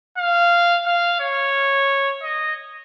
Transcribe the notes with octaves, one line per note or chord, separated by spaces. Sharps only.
F5
F5
C#5
D#5